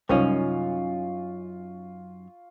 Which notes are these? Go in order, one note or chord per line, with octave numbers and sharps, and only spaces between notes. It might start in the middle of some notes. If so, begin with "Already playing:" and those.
C2 F#2 C#4 D#4 F4 C#6